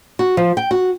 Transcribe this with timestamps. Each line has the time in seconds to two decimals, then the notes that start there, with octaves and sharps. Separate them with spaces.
0.19 F#4
0.37 F3
0.57 G5
0.71 F#4